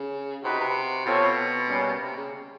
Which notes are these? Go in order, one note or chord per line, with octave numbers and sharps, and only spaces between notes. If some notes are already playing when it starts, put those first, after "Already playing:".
Already playing: C#3
C3 D#4 F#4 B4
C3
B2 C4 F4 A4 C#5
B2
G3 A#3 C#4
C3
C#3